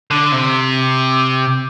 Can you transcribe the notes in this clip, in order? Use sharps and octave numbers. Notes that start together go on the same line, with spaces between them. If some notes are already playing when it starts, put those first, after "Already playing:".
D3
C3